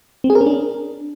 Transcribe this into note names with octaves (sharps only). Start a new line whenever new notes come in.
C4
G#4
A#4
C#4
D4